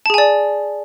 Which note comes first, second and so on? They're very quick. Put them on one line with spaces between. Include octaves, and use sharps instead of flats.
A5 G#4 G#5 D5